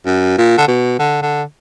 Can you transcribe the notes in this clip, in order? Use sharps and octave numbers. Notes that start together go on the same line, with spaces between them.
F#2
A#2
D3
B2
D3
D3